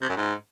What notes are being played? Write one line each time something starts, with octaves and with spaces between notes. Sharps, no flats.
C3
F#2
G#2